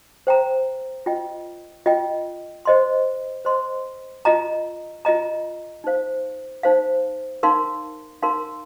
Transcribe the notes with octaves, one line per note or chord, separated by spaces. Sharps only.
C5 G5 A#5
F4 D#5 G5
F4 D#5 G5
C5 D#5 C6
C5 D#5 C6
F4 D#5 A#5
F4 D#5 A#5
D#4 C5 F5
D#4 C5 F5
D#4 A#4 F5 C6
D#4 A#4 F5 C6